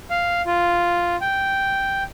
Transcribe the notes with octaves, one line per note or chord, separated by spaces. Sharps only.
F5
F4
G5